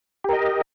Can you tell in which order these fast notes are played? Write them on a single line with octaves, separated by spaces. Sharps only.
G4 A#4 D#5